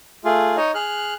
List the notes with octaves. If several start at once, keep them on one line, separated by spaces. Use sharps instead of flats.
A3 F4 G#4
D#4 C#5 D#5
G#4 F6 F#6